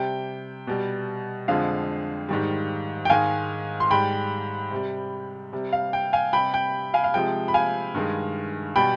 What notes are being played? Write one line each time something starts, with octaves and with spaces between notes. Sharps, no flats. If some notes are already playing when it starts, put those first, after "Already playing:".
Already playing: C3 G3 G5
B2 G3
F2 D3 F3 G#3 F5
G#2 D#3 G3
G5
G#2 D#3 G#3 F5 G#5
C6
G#2 G3 G5 B5
C3 G3
C3 G3
F5
G5
F5 G#5
C3 G3 G5 B5
G5
F5 G#5
F5
C3 F3 G#3 G5
B5
F5 G#5
G2 D#3 G#3
B2 G3 G5 B5